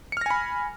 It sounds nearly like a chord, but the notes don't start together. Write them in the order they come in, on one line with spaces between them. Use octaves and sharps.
C#7 F6 A#6 G#5 B5